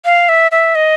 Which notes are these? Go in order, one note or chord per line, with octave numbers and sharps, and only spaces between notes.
F5
E5
E5
D#5